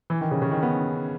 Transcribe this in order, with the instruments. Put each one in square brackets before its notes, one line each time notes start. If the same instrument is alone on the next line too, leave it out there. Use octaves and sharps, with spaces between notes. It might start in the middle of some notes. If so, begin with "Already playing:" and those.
[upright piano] E3
D#3
C#3
C#3
D#3
B3